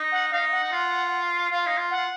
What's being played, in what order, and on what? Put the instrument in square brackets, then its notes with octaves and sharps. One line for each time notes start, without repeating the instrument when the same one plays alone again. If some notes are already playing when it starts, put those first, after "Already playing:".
Already playing: [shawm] D#4
[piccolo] F#5
[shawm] D#4 [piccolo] F5
[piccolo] F#5
[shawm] D#4
F4
[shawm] F4 [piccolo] F5
[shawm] D#4
F4
[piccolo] F#5
[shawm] F4